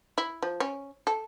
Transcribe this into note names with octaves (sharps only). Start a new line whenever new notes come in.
E4
F3
C#4
A4